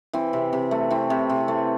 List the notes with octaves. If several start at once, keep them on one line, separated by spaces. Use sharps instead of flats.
E3 C4
C3
C3
A3
E3 C4
C3
C3
A3